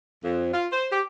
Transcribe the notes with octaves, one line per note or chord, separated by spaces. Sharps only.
F2
F4
C5
G4